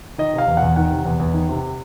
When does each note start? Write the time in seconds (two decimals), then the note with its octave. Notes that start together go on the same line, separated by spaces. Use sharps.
0.18 D#3 D#5
0.33 C3
0.38 F5
0.48 E2
0.57 F#5
0.62 E2
0.76 D#3 F#5
0.91 C3
1.06 E2
1.20 E2
1.34 D#3
1.49 C3